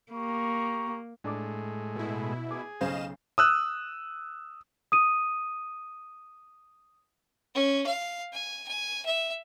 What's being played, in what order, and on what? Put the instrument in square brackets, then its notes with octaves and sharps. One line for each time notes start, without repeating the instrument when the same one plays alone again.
[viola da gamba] A#3 [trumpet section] G4 A#5 C#6
[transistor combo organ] A2 G#3 [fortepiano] D4 D6
[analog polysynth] B2 E4
[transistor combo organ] G#4 [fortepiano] D6
[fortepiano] B1 C#3 C5 [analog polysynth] D#5 F5 E7
[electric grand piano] D#6 E6 F#6
[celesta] D#6 D#7
[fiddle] C#4
F5
G#5
G#5
E5